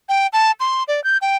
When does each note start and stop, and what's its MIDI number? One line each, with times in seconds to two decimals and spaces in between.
0.09 0.27 79
0.33 0.52 81
0.60 0.83 84
0.88 1.03 74
1.04 1.18 91
1.22 1.37 79